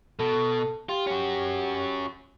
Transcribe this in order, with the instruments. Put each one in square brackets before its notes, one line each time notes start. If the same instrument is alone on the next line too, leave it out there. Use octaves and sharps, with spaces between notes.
[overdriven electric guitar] B2 [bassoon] A4
[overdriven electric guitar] F4 [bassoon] G4
[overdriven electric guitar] C#4 F#4